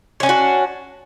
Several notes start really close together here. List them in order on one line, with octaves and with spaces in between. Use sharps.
C#5 C#4 D4 F#4